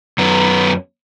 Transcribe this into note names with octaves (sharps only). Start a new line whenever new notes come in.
F#2 B3